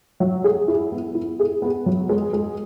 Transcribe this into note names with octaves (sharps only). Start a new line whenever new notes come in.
F#3
G#4
E4
B3
E4
G#4
B3
F#3
G#3
G#3